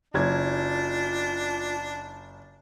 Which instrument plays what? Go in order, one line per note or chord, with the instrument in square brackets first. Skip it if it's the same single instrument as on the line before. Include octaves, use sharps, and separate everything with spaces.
[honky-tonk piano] F#1 G#6 [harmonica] D4 [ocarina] F4